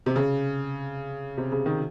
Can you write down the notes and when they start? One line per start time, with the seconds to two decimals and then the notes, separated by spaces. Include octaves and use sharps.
0.06 C3
0.16 C#3
1.37 C3
1.52 C#3
1.66 D#3